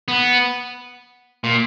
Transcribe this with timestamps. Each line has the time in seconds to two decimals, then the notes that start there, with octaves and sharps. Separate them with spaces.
0.08 B3
1.44 A#2